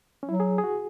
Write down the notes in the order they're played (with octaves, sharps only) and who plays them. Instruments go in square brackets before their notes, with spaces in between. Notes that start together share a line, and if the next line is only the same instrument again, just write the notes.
[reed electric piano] C#4
[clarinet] F#3 [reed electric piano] E4
[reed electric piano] G#4
G#4
F#4